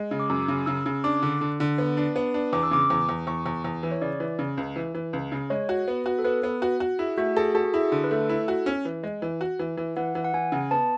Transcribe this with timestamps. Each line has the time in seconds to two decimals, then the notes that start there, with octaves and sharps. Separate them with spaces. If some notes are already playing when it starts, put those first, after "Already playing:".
Already playing: G#3
0.11 C#3
0.20 D6
0.30 F#2 E6
0.48 C#3
0.66 C#3 E6
0.86 C#3
1.04 D4 D6
1.23 D3
1.41 D3
1.60 D3
1.78 B3
1.97 D4
2.16 B3
2.34 D4
2.53 E2 D6
2.63 E6
2.71 C#3 D6
2.90 E2
3.09 E2
3.27 E2 C#6
3.46 E2
3.64 E2
3.83 E3
3.91 C#5
4.01 C#3 D5
4.20 E3
4.39 C#3
4.57 C#2
4.76 E3
4.95 E3
5.13 C#2
5.32 C#3
5.50 G#3 C#5
5.69 F#4
5.88 B3
6.06 F#4
6.19 A4
6.24 B3 B4
6.43 B3
6.62 F#4
6.80 F#4
6.99 E4 G#4
7.18 A3 F#4
7.36 G#4 A4
7.55 F#4 A4
7.65 F#4
7.74 E4 G#4
7.92 D3
8.04 B4
8.11 A3 A4
8.29 E4
8.48 F#4
8.66 C#4
8.85 E3
9.03 G#3
9.22 E3
9.41 F#4
9.59 E3
9.77 E3
9.96 E3 F#5
10.15 E3
10.24 F#5
10.34 E3 G#5
10.52 C#3
10.71 B3 A5